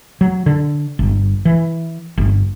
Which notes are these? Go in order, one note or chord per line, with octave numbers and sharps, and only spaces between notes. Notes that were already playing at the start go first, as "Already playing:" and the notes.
F#3
D3
G1
E3
G1